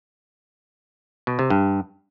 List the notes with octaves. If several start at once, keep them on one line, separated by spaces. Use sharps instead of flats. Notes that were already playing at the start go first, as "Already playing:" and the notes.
B2
C3
G2